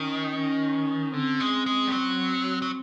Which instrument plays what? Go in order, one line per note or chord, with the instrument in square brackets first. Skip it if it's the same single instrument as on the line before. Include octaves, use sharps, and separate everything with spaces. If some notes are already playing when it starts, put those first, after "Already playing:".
Already playing: [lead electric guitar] D#3 [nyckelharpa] C#4
[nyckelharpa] C#4
[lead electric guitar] D3 [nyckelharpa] C4
[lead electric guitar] G#3
G#3
G3
F#3
F#3